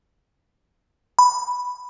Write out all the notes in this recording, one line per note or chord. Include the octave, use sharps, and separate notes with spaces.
B5